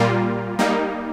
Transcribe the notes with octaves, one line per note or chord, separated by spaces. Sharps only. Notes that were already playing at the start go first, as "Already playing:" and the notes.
Already playing: A#2 G3 A#3 F4
G3 A#3 D#4